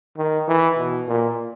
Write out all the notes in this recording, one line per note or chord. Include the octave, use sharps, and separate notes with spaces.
D#3
E3
B2
A#2